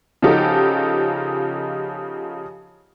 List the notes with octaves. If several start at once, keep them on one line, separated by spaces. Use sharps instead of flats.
C#3 F3 D#4 F#4 G4 A4